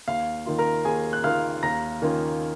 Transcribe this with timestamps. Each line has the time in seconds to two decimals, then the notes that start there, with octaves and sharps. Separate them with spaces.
0.07 D#2 F5
0.46 D#3 A#3 F4
0.58 A#4 A#5
0.85 D#2 G#4 G#5
1.13 F#6
1.24 D#3 A#3 F4 F5 F6
1.63 D#2 A#5 A#6
2.02 D#3 A#3 C#4 F4